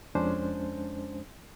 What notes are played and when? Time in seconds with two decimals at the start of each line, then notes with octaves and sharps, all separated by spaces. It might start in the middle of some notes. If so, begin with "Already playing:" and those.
0.15 F2 G#3 C#4 D4 C5